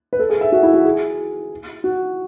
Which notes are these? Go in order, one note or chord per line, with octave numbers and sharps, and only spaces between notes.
B4
A4
G#4
E5
F#4
E4
F#4
G#4
F#4